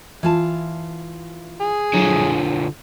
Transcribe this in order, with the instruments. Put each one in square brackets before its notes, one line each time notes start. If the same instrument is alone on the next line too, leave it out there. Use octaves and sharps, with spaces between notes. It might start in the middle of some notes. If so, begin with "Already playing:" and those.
[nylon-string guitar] E3 F4 A5
[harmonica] G#4
[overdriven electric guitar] D3 F3 [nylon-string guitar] F#3